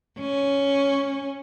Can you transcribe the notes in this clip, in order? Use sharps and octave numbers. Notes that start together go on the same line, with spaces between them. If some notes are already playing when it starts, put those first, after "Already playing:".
C#4